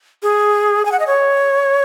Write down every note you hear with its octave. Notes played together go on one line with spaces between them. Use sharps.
G#4
G#5
F#5
D#5
C#5